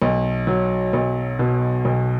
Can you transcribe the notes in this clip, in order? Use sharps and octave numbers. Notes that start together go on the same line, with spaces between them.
B1
F#3
B1
B2
B1